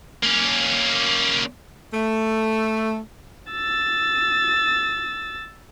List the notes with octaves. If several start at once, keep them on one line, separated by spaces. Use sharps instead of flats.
A#3 C#4
A3
E6 A6